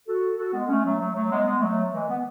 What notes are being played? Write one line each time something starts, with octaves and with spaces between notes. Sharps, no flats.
F#4 A4
F#4 A4
G#3 B3
A3 C#4
F#3 A3
F#3 A3
F#3 A3
G#3 B3
G#3 B3
F#3 A3
E3 G#3
B3